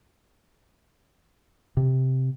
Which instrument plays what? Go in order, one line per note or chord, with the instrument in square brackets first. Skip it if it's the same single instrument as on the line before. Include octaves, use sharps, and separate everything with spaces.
[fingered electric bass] C3